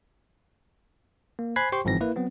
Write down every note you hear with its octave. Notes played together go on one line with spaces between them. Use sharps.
A#3
C5 G#5 B5 F#6 G#6 C7
G4 C5 G5 C6 C#6
G1 G#2 E3 F3 C4 A#6
A#3 E4 B4
F#3 B3 C4